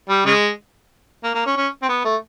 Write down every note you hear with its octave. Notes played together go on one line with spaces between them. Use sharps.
G3
C#3 G#3
A#3
A#3
C#4
C#4
C4
B3
A3